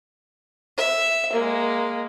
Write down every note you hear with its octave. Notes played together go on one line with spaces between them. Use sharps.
E5
G#3 A#3